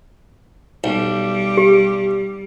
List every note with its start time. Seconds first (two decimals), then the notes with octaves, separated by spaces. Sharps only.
0.84 B1 G3
1.57 G4